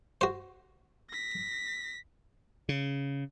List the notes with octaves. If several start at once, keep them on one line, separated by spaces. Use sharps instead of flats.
F#4 C5
A#6 B6
C#3